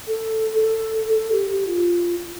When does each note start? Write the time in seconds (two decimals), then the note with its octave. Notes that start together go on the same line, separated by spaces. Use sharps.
0.08 A4
0.61 A4
1.15 A4
1.32 G4
1.50 G4
1.67 F4